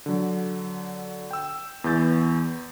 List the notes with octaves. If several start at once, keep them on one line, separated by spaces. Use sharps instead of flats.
D3 F#3
G5 E6
E2 E3 G6 A6